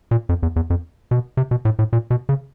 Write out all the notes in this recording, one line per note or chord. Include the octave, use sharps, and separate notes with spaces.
A#2
F2
E2
E2
F2
B2
C3
B2
A2
A2
A#2
B2
C#3